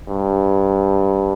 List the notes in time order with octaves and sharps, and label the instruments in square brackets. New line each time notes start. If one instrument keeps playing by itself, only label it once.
[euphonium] G2